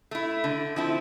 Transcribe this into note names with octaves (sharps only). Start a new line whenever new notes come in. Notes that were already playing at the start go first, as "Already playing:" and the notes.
A3 E4
D3
F3 C4 E4